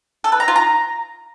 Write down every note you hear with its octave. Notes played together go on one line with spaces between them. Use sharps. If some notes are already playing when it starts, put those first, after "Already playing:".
A4
B4
A#5
F4
A#5